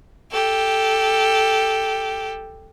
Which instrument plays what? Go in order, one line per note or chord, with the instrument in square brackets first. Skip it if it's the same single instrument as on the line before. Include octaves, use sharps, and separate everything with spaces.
[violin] G4 A4